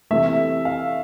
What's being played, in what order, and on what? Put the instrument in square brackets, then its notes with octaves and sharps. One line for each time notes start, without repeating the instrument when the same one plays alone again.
[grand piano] C3 E3 A3 E5
F5